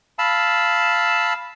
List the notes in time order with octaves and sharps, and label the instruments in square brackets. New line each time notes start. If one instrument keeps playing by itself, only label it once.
[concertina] F5 A5 B5 E6